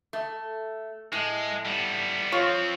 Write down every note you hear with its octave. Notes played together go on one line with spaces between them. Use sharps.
A3
A2 G#3
G3 B3
F3 C4 F4 C#5